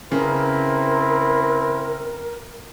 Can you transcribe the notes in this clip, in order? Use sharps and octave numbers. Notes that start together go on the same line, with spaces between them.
C#3 C4 E4 A#4 B4